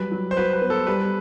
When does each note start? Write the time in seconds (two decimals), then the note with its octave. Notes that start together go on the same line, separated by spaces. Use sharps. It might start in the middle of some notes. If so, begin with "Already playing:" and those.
Already playing: F#3 G3 B4
0.11 F#3
0.31 C5
0.36 F#4 B4
0.53 B4
0.61 B3
0.70 A4
0.87 G3 B4